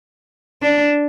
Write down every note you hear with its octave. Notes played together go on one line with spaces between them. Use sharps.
D4